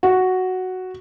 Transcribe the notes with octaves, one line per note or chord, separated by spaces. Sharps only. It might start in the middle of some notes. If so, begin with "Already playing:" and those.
F#4